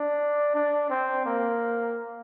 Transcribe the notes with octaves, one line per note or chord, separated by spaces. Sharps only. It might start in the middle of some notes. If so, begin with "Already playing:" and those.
Already playing: D4
D4
C4
A#3